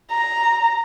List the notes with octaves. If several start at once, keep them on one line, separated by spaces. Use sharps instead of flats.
A#5